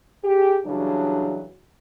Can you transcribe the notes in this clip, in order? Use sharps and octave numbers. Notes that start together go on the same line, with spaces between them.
G4 G#4
C#3 E3 F#3 G3 D4